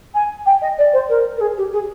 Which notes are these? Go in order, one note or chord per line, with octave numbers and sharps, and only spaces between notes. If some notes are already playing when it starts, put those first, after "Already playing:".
G#5
G5
D#5
D5
C5
A#4
A#4
G#4
G4
G#4